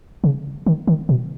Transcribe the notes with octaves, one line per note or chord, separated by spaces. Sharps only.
C#3
D#3
D#3
B2